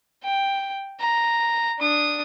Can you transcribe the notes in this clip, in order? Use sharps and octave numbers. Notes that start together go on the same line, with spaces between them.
G5
A#5
D4 D#6